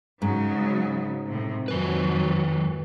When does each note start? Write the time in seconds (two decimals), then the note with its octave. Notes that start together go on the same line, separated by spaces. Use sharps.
0.22 G#2 C#3 F#3
1.26 A2 C3
1.68 F2 D#3 F#3 B4